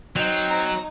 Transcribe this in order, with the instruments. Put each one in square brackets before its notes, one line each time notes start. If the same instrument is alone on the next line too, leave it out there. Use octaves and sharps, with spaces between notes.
[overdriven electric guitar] F#3 [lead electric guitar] C4 [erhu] D#4
[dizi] A#5